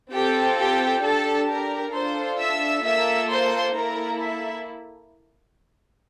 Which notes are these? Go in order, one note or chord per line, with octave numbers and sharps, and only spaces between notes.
C4 F4 G4 A4 G5
G4 G5
D4 G4 A4 A5
A#4 A#5
D4 F4 A4 C5 C6
E5 E6
A#3 F4 A4 E5 E6
C5 C6
A#3 E4 A4 A#4 A#5
E5